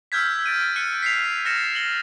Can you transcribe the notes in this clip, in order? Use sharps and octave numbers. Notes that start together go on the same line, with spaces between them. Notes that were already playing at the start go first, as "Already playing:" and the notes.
E6 F6 G6 G#6 B6
A6 D7 D#7
F6 F#6 C#7 D#7
B6 C7 F7
F6 A6 A#6 C#7 E7
F#7 G7